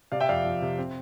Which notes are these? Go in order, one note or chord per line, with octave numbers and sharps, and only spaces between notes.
C3 D5 F5
E5 G5
F2 D5 F5
F2
C3
C4